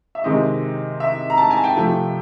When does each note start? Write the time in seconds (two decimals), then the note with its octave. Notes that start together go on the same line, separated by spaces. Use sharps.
0.15 E5
0.24 C3 D#3 G#3 C4 D#4 D#5
1.00 E5
1.30 A#5
1.38 A5
1.51 G#5
1.64 G5
1.76 C3 F3 A3